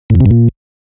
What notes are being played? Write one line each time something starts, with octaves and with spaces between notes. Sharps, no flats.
A2
F2
C3
G2
A#2